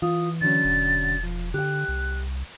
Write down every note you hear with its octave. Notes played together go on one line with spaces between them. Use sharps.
E3 F4 D#6
D3 F#3 C#4 A6
E1
F3
D3 G4 G5 F#6
C2